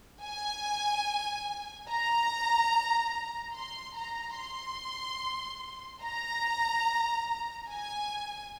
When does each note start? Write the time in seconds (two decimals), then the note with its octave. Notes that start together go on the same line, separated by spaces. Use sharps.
0.22 G#5
1.88 A#5
3.54 C6
3.95 A#5
4.37 C6
6.03 A#5
7.69 G#5